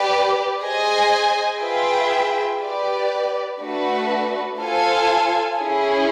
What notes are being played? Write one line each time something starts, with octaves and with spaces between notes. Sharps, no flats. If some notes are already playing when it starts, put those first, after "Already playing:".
Already playing: G4 B4 D5
G#4 C5 D#5 G#5
F4 G#4 B4 E5 G5
G4 B4 D5
A3 D4 F#4 B4
F4 A4 C5 F5 G#5
C#4 E4 G#4